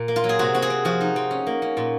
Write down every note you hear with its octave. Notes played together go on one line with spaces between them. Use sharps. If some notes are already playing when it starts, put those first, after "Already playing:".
Already playing: A#2
A#3
F4
F#3
G#4
C3 F#4
C4 F#4
G#4
C4
F3 F#4
D#4
C4
C#4
A#3
C#4
A#2